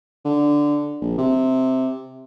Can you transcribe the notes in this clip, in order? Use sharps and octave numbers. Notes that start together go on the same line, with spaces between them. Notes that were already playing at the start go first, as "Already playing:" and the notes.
D3
A#1
C3